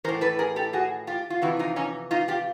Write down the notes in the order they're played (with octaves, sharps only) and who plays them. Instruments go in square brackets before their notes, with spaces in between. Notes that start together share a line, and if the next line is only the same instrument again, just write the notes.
[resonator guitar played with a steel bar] E3 A#4 C5
A2
A4 B4
G#4 A#4
G4 A4
F#4 G#4
F4 G4
F4
F2 C3 E3 E4 F#4
D#4 F4
C#4 D#4
D#4 F4
F4 G4